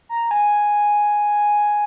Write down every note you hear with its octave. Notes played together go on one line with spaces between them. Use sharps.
A#5
G#5